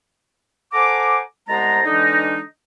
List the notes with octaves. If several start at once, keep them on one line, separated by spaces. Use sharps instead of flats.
A4 C5 F#5 G#5 A#5 D6
C2 G#3 B3 C5 A5 A#5
D3 E3 G#3 D4 D#4